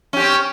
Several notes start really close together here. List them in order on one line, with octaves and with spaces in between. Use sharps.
C#4 G4 C4